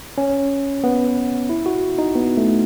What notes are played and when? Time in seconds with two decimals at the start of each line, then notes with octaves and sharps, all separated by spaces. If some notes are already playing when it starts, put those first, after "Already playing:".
0.18 C#4
0.84 B3
1.50 E4
1.66 F#4
1.98 D#4
2.15 B3
2.37 A3